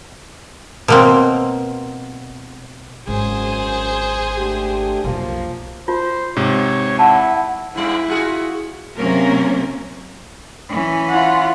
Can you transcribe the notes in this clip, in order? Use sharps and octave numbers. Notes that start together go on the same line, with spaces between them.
B2 A#3 C4
G#1 F#2 G#4 C5
A3 D4 G4
B1 F2 F3 A#3
F4 C5
G#2 C3 C#5
E4 F#5 A5
G#2 G3 E4
F4 F#4 G#4
C3 F#3 A#3 C#4 A#4
E3 C#4
F4 F#5